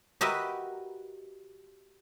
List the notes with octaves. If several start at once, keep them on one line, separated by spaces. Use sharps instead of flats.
F#4 G4 A#4 B4 D#5 E5